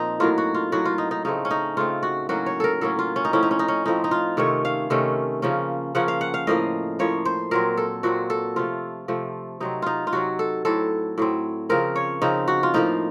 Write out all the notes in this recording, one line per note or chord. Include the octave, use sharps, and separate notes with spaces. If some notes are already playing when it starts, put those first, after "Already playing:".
Already playing: A#2 F3 C4 D#4
A2 F#3 A#3 F4
F#4
F4
A2 F#3 A#3 F#4
F4
D#4
D#4
C#3 A3 C4 D#4
C#4
D#4
C#3 A3 C4 F4
F#4
A2 F#3 A#3 C#4 F#4
C#5
A4 A#4
A2 F#3 A#3 C#4 A4
F4
C#4
D#4
A2 F3 C4 C#4
D#4
C#4
D#4
C#4
A2 F3 C4 D#4
D#4
F4
C3 D#3 A3 C#4 C#5
F5
C3 D#3 A3 C#4
C#3 F3 A#3 C#4
C#3 F3 A#3 C#4 F#5
F5
F#5
F5
A2 F3 A#3 D#5
A2 F3 A#3 C#5
C5
A#2 F#3 C4 A#4
A4
A#2 F#3 C4 F#4
A4
C3 F3 A3 F4
C3 F3 A3
C3 F#3 C4 D#4
D#4 F4
F4
C3 F#3 C4 F#4
A4
A2 F#3 C4 A4
A2 F#3 C4
C#3 F3 C4 A#4
C#5
C#3 F3 C4 D#4
F#4
F4
A2 F3 A#3 D#4